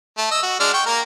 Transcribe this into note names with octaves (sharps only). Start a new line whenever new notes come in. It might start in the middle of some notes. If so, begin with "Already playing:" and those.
A3
D#5 E6
F#4
G#3 D4 F6
G5 C#6
A#3 A#4